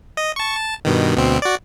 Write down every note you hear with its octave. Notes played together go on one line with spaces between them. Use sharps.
D#5
A5 C#6
A5
G2 B2 D#3
D2 B2 C4
F#4 D5